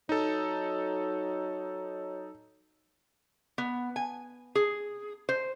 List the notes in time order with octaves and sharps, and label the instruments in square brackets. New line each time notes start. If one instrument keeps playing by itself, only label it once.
[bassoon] F#3 [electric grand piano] D#4 A4
[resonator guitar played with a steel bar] B3
G#5
G#4
C5